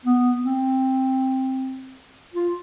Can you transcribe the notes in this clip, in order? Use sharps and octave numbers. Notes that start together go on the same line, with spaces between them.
B3
C4
F4